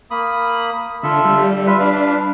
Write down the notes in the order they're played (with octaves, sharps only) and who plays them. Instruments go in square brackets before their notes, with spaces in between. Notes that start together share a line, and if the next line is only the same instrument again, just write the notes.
[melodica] A#3 B5 D#6
[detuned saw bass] D3 [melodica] F4 A4 E5
[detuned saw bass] G3
[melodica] F4 B4 E5
[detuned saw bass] D4 [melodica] B4 F5